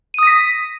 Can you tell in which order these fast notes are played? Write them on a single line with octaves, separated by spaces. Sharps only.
D#7 D#6 A#6 B6